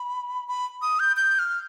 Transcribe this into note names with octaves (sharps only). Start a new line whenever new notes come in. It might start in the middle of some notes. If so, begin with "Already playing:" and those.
Already playing: B5
B5
D#6
G6
G6
F6